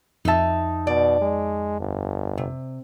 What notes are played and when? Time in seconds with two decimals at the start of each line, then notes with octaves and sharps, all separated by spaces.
0.25 F2 D#4 E5 A5
0.87 B2 D5
1.21 G#3
1.80 G1
2.38 C3